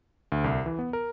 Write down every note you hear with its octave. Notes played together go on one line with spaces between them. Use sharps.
D2
C2
E3
B3
A#4